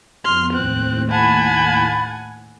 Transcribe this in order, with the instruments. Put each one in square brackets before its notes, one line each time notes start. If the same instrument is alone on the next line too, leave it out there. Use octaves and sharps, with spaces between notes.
[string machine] F2 B3 [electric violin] C6 F6
[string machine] D#2 A2 [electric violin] C4 F#6
[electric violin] F#5 G#5 [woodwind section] A5 B5